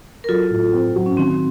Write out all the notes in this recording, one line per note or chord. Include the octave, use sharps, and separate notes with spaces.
A#4
F#3 F4 A4
A2
C4
F#3
C#4
D#3 C4